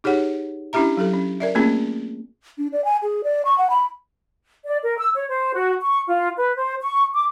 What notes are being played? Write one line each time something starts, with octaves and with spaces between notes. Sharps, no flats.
D#4 G4 G#4 C#5 F#5
C#4 D4 E4 G4 E5 A#5
F#3 G4 A4
C#4
A#4 D5 E5
A3 A#3 C4 C#4 F4 G#4
D4
D5
G#5
G#4
D5
C#6
F#5
B5
D5
A#4
E6
C#5
C5
F#4
C#6
F4
B4
C5
C#6
D6